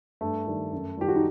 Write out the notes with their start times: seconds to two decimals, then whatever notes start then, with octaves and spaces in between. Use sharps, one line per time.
0.21 G2 A3
0.46 D#3 G3
0.72 F#2
0.97 D#3 G3 G4
1.08 F#4
1.16 D#4